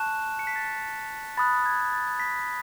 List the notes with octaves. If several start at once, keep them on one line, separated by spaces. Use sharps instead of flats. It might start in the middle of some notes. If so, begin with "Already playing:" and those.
Already playing: A5 C#6 F#6 E7
C#7
B6
A6
B5 D#6 F#6 A6
G#6
A6
A6
B6